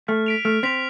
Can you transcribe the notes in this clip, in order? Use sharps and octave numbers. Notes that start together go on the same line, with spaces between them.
A3 F6
B6 D7 F7
A3 F6
C4 B6 D7 F7